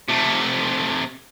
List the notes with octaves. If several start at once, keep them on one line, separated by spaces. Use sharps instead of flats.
C3 A3